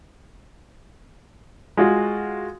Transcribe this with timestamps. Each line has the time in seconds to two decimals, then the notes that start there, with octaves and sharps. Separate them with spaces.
1.77 G#3 F4 F#4